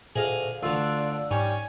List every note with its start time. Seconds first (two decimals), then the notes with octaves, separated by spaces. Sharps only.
0.16 D2 A#2 G#4 D#5 F5
0.63 D2 D3 D4 F4 E6
1.31 G#2 G3 C#4 G#5